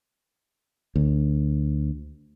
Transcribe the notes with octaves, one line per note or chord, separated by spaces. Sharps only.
D2